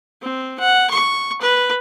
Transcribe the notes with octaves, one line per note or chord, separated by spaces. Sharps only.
C4
F#5
C#6
B4